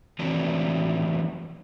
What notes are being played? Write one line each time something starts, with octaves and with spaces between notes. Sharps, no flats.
D#3 E3 F#3 A3 C4 D4